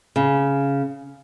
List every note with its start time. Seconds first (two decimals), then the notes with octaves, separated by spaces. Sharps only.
0.16 C#3